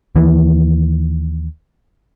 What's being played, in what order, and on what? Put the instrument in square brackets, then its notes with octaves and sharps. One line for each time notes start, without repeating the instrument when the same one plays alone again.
[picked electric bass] D#2 E3